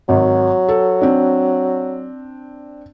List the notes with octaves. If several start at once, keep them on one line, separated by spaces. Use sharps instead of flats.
G#1 F#3
A4
C4 D4